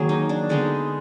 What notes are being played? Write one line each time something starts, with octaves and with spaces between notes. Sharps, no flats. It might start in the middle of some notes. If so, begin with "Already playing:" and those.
Already playing: D#3 F#3 A#3 G#4
D#4
D4
D3 G#3 B3 D#4